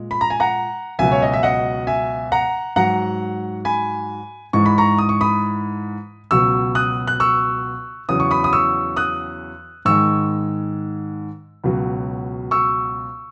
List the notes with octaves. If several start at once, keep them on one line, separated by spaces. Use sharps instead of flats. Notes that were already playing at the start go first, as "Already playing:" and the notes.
Already playing: A#2 G#3
B5
A#5
G#5
F#5 A#5
C#2 B2 F#3 E5 G#5
C#5
D#5
E5
D#5 F#5
E5 G#5
F#5 A#5
G#2 F#3 F#5 A#5
G#5 B5
G#2 E3 G#3 C#6
B5
A#5 C#6
D#6
C#6
B5 D#6
C#2 B2 F#3 C#6 E6
D#6 F#6
F#6
C#6 E6
E2 C#3 F#3 D#6
C#6
B5 D#6
D#6
C#6 E6
D#6 F#6
G#2 D#3 G#3 C#6 E6
C#2 B2 F#3
C#6 E6